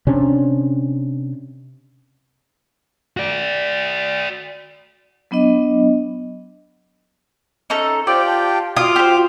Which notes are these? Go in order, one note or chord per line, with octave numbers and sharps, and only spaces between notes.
C3 C#4 D4
F#4 D5
F#3 B3 D4 D#5
C#4 D#4 A4
F4 G4 C5 D5 G5
A5
F4 F#4 D6 D#6
G4 C5